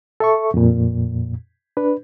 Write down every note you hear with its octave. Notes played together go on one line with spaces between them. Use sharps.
A4 E5 C#6
F2 A#2
D4 B4